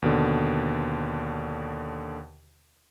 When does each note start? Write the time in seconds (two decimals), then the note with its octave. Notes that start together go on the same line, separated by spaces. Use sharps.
0.02 D#2 B2 D3